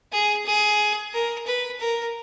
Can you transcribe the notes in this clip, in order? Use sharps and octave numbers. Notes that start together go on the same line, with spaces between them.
G#4
G#4
A#4
B4
A#4